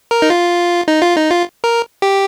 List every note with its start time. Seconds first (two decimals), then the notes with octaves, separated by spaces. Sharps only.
0.11 A#4
0.22 D#4
0.30 F4
0.88 D#4
1.02 F4
1.17 D#4
1.30 F4
1.64 A#4
2.02 G4